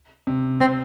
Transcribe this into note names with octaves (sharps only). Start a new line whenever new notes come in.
C3
C3 C4